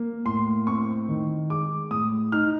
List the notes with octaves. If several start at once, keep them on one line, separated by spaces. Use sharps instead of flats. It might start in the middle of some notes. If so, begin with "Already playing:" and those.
Already playing: A#3
A2 C6
C4 C#6
D#3
G#3 D6
A2 D#6
D#4 F6